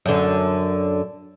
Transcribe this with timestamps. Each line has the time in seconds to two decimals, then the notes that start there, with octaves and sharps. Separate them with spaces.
0.06 F#2 D3